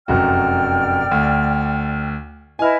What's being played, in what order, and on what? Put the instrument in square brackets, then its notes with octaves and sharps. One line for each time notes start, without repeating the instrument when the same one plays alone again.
[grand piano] F1 F#2 F#4 [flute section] D5 G5 F6
[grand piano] D2
[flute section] E4 B4 D#5 [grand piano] G#5 F6